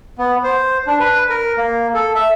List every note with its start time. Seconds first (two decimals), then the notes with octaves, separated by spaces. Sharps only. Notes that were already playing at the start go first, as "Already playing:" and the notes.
0.18 B3
0.43 C5
0.87 D4
1.00 B4
1.29 A#4
1.57 A#3
1.94 A4
2.15 E5